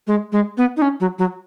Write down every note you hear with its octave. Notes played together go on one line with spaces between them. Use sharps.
G#3
G#3
B3
D#4
C#4
F#3
F#3